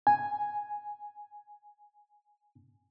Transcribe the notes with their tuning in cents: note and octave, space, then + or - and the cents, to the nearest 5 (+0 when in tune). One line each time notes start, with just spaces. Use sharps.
G#5 +0